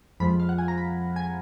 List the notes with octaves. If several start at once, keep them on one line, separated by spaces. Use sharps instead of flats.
F2 F3 G#3 B5
F5
F#5
G#5
A#5
B5
G#5